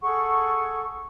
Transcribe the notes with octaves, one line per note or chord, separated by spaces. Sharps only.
G#4 A4 F#5 C#6